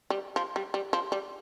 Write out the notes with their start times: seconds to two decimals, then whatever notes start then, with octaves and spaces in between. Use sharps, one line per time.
0.10 G3
0.36 F3
0.56 G3
0.74 G3
0.93 F3
1.12 G3